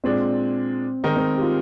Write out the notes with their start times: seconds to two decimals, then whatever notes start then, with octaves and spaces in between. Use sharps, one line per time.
0.04 A#2 G#3 C4 D4
1.03 D#3 G#3 C4 D#4 A#4
1.16 C4
1.37 G4
1.41 F4